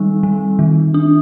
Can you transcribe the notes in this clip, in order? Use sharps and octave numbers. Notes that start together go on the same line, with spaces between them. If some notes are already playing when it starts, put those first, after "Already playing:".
Already playing: D#3 G3 C4 D#4
G3
D#3
D4